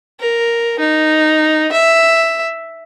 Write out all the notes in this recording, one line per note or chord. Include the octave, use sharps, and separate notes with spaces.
A#4
D#4
E5